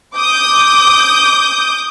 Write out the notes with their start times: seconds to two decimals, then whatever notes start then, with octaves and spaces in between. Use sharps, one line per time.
0.17 D6 D#6 G6